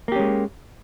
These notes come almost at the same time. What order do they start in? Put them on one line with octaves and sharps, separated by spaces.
A#3 G4 C#4 G#3